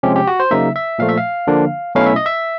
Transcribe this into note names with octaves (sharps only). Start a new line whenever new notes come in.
C3 F3 G#3 C#4 G4
G4
F#4
C5
C#3 F#3 A#3 D#4 E5
E5
A#2 F3 A3 F5
E5
F5
D3 F3 A#3 D4
B2 F#3 A3 C#4 E4 F5
E5
D#5
E5